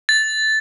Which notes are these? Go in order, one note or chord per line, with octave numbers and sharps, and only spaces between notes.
A6